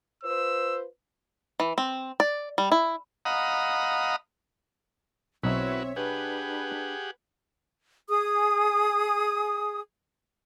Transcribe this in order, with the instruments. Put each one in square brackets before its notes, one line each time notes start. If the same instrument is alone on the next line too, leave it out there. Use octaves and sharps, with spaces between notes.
[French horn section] F4 B4 C5 [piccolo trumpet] E6
[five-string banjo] E3
C4
D5
G3
E4
[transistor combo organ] D#5 F5 F#5 A#5 B5 D#6
[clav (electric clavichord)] B1 D#4 [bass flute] C4 [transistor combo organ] E4 F#4 B4 [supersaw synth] C#5 E5
[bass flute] D4 [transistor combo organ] G4 G#4 F#5 [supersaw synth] B4
[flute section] G#4 D#6